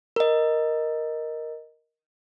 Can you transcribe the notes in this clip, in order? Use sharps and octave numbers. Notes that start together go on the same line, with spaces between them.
A#4 D#5